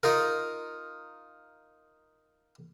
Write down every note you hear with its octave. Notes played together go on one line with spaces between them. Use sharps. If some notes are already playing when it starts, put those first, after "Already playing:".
D#4 F4 A#4